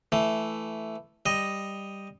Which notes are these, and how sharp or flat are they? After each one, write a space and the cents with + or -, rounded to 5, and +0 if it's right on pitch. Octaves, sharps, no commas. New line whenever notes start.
E3 +5 A3 +0
G3 +5 D#5 +0